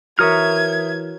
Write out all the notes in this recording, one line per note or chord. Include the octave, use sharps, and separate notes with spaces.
E3 F#4 A#4 C#5 E5 D#6 F6 G#6